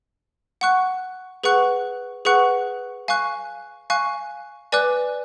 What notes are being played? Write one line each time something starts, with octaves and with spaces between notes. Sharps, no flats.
F#5 C#6 F#6
G#4 B4 F#5 C#6 F#6
G#4 B4 F#5 C#6 F#6
F5 G#5 C#6 F#6
F5 G#5 C#6 F#6
B4 D5 G#5 D6 F#6